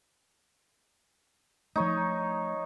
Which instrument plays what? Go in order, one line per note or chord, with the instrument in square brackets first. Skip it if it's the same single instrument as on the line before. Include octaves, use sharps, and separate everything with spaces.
[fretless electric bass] F3 A3 [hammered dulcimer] D#4 C#5